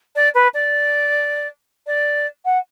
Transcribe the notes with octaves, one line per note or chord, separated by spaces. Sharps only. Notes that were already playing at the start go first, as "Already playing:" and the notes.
D5
B4
D5
D5
F#5